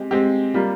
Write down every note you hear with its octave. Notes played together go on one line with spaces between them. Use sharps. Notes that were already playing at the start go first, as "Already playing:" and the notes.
Already playing: G#3 C4 G4
G#3 C4 G4
G3 A#3 F4